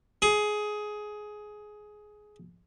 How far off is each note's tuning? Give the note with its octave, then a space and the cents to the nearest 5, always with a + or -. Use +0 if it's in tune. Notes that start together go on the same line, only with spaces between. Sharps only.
G#4 +15